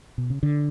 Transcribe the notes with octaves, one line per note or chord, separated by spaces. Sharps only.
B2
C#3
D3